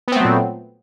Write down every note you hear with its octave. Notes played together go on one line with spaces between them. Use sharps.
A#2 F#3 A3 B3 C4